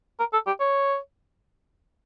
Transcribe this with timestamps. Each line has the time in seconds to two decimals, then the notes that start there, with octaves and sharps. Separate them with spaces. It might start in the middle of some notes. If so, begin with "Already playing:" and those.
0.19 A#4
0.33 A4
0.47 G4
0.60 C#5